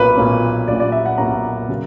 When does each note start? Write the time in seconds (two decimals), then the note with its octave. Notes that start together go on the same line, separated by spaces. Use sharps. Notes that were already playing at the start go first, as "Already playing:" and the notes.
Already playing: B1 A#2 A#3 C#4 B4
0.17 B1 A#2 A#3 C#4
0.68 B1 A#2 A#3 C#4 D5
0.80 D5
0.92 E5
1.06 F#5
1.18 B1 A#2 A#3 C#4 A#5
1.69 C#3 F#3